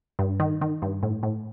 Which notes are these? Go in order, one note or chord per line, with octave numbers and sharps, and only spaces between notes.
G2
D#3
D#3
G2
A2
A2